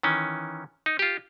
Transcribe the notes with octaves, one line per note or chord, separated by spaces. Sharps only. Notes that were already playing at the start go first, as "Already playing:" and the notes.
D#3 E3 C#4
D#4
F4 G4